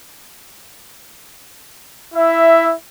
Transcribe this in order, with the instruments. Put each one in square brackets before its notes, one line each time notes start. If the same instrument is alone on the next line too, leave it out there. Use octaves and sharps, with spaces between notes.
[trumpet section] E4 E5